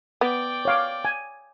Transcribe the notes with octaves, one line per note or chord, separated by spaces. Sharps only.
B3 D5 G5
C#5 F5 D6
G#5